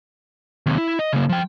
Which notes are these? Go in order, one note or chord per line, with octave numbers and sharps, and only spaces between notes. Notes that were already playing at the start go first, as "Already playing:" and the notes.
D#2 C3
E4
D#5
C#3 A#3
F3 G5